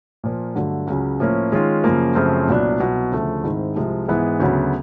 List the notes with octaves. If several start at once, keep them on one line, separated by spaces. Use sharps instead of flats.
A#2 F3 A#3
G2 D3 F#3 A3
C#2 C#3 F#3
A2 F3 A#3 C#4
D#3 G#3 C#4 F4
F#2 C#3 F3 A#3
F#2 C#3 F3 A3 C4
C2 A#2 F#3 B3 D4
C2 B2 F#3
D2 C#3 F3 A3
G#2 D#3 G#3 C4 E4
C2 C3 F3 G#3
G#2 E3 G#3 B3 E4
D2 C#3 F#3 B3